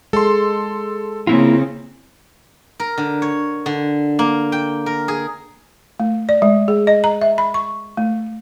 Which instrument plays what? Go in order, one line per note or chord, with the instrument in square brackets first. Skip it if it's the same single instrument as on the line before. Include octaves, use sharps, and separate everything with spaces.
[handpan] G#3 [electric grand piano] A4 C6
[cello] C#3 C4 [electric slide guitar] A#3 E4 F4
[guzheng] A#4
D3
C#5
D3
A#3
G5
A#4
G#4
[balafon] A3
D5
G#3
G#4
D#5
A#5
E5
B5
C#6
A3